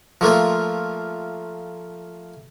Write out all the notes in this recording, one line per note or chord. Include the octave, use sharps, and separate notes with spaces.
F3 A3 A#3 F4